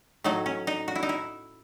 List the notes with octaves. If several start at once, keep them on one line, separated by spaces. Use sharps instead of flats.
A2 F#3 A3 D#4
C#4
D#4
F#4
E4
D#4
E4